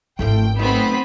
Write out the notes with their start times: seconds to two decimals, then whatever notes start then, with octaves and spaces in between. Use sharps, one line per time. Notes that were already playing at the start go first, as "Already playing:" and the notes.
0.19 G#1 C#3 F3 A3 E4 G5
0.59 F#3 A3 B3 C4 D#4 B5